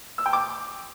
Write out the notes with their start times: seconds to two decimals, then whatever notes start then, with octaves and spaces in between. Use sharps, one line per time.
0.18 E6
0.26 G5
0.33 D6